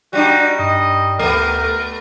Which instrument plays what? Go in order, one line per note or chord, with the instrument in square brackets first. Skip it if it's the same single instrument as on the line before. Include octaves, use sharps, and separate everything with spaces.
[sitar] G3 D4 D#4 [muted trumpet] F#4
[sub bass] G2 [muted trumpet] D#5
[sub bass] D2 [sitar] A3 B3 [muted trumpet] A#4